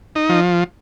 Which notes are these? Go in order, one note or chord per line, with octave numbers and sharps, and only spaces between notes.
D#4
F3